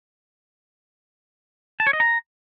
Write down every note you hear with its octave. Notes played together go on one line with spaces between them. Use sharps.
A5
C#5
D#5
A#5